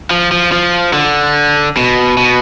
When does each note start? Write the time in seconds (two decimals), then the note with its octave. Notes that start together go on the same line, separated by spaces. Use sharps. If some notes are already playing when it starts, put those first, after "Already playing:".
0.11 F3
0.32 F3
0.52 F3
0.93 D3
1.77 B2
2.17 B2